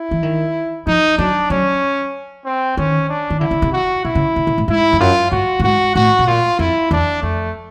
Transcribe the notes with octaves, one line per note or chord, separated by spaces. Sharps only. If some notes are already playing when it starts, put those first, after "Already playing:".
Already playing: E4
E3
D#3
F3 D#4
F#3 D4
F#3 C#4
C4
D#3 C#4
D4
D#3
D3 E4
C#3
C3
F#4
C3 E4
C#3
C#3
C3
A2
G#2 E4
F2
F#2 F4
G2 F#4
A2
G#2 F#4
A2 F#4
B2
A#2 F4
F2 E4
E2 D4
F2 A3